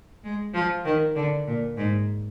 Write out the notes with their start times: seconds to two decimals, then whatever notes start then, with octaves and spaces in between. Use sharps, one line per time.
0.24 G#3
0.54 F3
0.85 D#3
1.16 D3
1.47 A#2
1.77 G#2